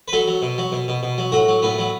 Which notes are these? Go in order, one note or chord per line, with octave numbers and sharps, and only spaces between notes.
B4
F#3 A4
F#3
B2
F#3
B2
B2
B2
F#3
A2 F#4
F#3
A2 B3
F#3